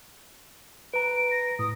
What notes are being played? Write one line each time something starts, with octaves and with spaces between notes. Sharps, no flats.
B4 A#5 D7
A#6
A2 D#6